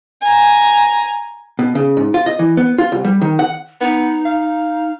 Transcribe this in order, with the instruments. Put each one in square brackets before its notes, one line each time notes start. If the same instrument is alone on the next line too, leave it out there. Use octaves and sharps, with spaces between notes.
[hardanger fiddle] G#5 A#5
[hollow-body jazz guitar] B2
C#3
G#2
F4
D#5
E3
B3
F4
C2
G3
D#3
F#5
[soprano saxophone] B3 [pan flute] D#4
[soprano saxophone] F5